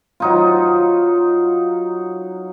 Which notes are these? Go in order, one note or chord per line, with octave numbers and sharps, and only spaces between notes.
F#3 D#4 F4